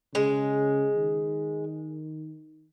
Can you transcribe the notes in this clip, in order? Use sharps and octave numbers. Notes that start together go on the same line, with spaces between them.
C#3 G#3
D#3